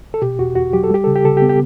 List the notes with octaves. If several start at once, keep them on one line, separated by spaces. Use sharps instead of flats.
A4
B2 G4
E2 F#4
E2 F#4
F#3 G4
A4
G3 G4
C#3 A4
G4
C#3 A4
G4
B3
G4